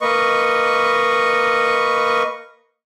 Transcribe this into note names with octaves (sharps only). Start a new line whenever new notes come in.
A#3 B4 D#5 C#6